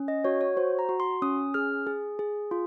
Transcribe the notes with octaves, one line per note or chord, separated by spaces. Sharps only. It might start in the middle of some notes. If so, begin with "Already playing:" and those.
Already playing: C#4
D#5
F#4 C#5
C#5
F#4 C5
A#5
F#4
C6
C#4 D#6
G#4 F6
G#4
G#4
F4